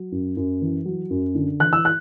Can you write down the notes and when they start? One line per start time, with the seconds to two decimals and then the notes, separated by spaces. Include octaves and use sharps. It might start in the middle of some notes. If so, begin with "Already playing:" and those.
Already playing: F#3
0.12 F#2
0.37 F#2
0.61 E3
0.85 F#3
1.10 F#2
1.35 D3
1.60 E3 F#6
1.73 E6
1.85 F#6